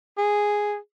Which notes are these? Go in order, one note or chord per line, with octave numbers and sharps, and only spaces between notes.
G#4